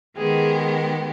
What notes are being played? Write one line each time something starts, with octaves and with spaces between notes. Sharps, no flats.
D#3 G#3 B3 G4 G#4